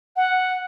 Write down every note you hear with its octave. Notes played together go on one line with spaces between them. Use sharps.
F#5